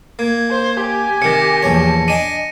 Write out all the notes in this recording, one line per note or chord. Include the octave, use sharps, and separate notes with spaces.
A#3 G#6
C5
G4 G#5
C3 D#3 D6 A#6 C#7
A#1 E2 C#5 A5
D4 D#5 G#5 D#7